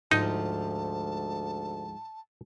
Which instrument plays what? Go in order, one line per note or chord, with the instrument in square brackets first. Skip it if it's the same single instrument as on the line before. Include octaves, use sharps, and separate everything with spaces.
[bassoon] D2 [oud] G#2 F3 [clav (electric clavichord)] D#4 [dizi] A5